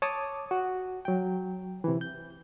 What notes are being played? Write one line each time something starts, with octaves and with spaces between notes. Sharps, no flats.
C#5 A5 D6 D#6
F#4
F#3 G5
C3 E3
G6